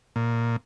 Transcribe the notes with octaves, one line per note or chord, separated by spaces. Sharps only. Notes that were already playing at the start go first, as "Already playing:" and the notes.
A#2